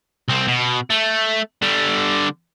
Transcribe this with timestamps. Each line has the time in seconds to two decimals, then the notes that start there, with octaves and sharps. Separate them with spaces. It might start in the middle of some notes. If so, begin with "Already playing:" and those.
0.28 C2 C4
0.48 B2
0.90 A3
1.62 D3 G3